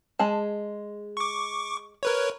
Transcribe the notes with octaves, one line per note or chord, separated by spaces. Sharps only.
G#3 G#4 A5
C#6 D6
A#4 B4 C#5